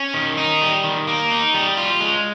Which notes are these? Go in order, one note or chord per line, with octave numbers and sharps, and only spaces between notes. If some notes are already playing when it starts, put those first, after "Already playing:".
Already playing: C#4
D#3
D#4
G3
D#3
A#3
D#4
G3
F4
G#3